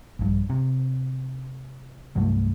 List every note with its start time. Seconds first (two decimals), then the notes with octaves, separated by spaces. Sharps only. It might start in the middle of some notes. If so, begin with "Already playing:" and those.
0.19 A#1 G2
0.50 C3
2.16 C2 G2 F#3 A3